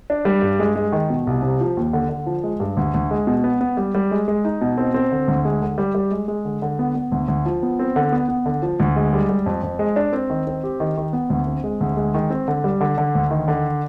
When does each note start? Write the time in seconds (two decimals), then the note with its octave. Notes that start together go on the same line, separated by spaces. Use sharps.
0.10 D4
0.25 G3
0.42 G2
0.59 G#3
0.75 G#3
0.92 D#3
1.10 B2
1.27 C2
1.42 C3
1.60 F3
1.77 D#2
1.93 D3
2.09 D3
2.26 F3
2.44 G#3
2.60 G2
2.77 D2
2.94 D2
3.11 G#3
3.27 B2
3.44 B3
3.61 B3
3.77 G3
3.95 G3
4.11 G#3
4.28 G#3
4.45 D#4
4.61 B2
4.78 C4
4.94 C4
5.12 D3
5.28 D2
5.45 G#3
5.62 D3
5.78 G3
5.95 G3
6.11 G#3
6.28 G#3
6.45 D3
6.62 D3
6.79 B3
6.95 B3
7.12 D2
7.28 D2
7.46 F3
7.63 B3
7.79 C4
7.96 D3
8.12 B3
8.29 B3
8.46 D3
8.62 F3
8.80 D2
8.96 G#3
9.13 G3
9.29 G3
9.46 F2
9.63 F2
9.79 G#3
9.96 D4
10.13 C4
10.30 D#3
10.47 C4
10.64 G4
10.80 D#3
10.97 D#3
11.13 B3
11.30 D2
11.47 C4
11.64 G#3
11.81 D2
11.97 G#3
12.14 D#3
12.30 C4
12.48 D3
12.64 G3
12.81 D3
12.98 D3
13.15 D2
13.31 D#3
13.48 D3